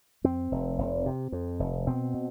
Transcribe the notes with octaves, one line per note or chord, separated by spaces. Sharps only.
F2 C4
F1
F1
C3
F2
F1
B2 C4
B2